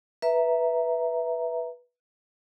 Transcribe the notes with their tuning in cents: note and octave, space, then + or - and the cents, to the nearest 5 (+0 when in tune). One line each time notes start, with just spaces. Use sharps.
B4 -10 E5 +0 A#5 +0